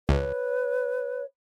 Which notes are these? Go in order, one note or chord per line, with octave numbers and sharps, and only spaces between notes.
C#2 B4 C#5